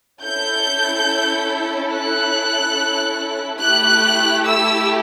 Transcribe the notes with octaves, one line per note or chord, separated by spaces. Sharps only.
C#4 E4 A4 G6
F#6
A3 E4 G4 F#6
E6